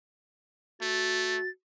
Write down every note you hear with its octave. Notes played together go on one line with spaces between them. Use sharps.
A3 F#4 A6